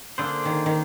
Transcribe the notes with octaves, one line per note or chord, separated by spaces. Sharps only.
D3 A#3 D4 G#4 C5
D#3
D#3